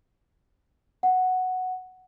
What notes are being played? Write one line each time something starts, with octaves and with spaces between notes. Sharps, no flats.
F#5